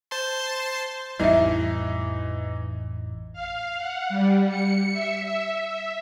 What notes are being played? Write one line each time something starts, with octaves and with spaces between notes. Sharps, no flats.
C5 A5 C6
A1 F2 E3 G3 D#4 D#5 E5
F5
F#5
G3
C#7
E5
E5
E5